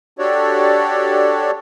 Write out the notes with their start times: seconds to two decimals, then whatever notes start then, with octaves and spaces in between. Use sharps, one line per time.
0.19 D4 F#4 G4 A4 C#5 D5